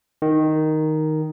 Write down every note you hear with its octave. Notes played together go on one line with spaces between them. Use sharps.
D#3